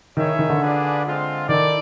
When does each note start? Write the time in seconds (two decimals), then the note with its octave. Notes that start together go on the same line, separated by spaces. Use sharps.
0.17 D#3 C#4 E4 G#4 C#5 E5
0.39 D#3
0.49 D3
0.61 D4 F4 G#4 B4 D5
1.05 G#3 C4 F4
1.48 D#3 E4 A4 D5